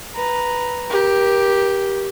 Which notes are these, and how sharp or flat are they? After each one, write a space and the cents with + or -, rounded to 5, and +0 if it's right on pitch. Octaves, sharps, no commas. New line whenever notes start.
B4 +0 A#5 +0
G4 +0 A#4 +30